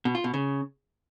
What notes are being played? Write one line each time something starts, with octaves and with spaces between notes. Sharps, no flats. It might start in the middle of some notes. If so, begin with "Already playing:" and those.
B2
F4
B2
C#3